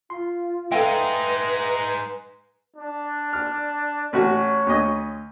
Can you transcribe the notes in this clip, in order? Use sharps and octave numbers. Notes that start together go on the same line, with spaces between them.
F4 C6
G#3 D#4 A4 B4 E5 F5 G5
D4
F6
A1 F#4 C#5
D2 D#5